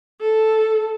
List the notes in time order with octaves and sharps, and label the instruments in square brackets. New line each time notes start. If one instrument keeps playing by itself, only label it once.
[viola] A4